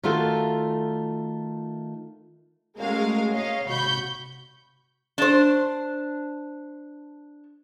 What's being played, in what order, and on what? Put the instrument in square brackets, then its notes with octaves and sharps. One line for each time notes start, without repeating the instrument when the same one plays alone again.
[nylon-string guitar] D#3 A3 F4 F#4 A4
[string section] G#3 A3 C#4 F#4 A#4 F5
A#3 C#5 D#5 F5
G#1 C3 F#4 B5 C#6 G6
[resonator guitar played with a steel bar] D4 C5